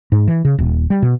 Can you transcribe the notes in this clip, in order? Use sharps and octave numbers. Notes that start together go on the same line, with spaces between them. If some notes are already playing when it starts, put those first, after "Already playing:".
G#2
E3
C#3
D#1
G3
B2